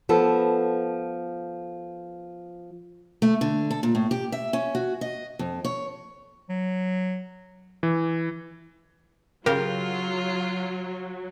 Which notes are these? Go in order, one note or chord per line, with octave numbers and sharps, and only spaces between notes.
F3 B3 A4
A3
D3
A4
A#2
A2
G4
E5
C#4
F#4
D#5
F2
C#5
F#3
E3
C#3 F#3 F4 G4 A#4